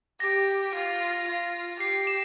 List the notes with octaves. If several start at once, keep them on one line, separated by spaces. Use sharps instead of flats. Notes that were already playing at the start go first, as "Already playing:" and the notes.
G4 A#6
F4
F4
G4 C7
E7